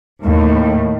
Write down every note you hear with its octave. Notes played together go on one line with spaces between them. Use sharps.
D#2 A2